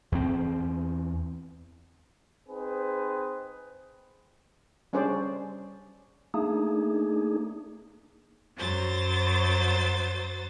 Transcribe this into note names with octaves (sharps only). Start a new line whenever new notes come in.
E2 C4
C4 D#4 G#4 B4 C5
G3 C#4 D4 G#4 C5 D5
A3 A#3 D4 D#4 G#4
F#2 F#3 C5 A6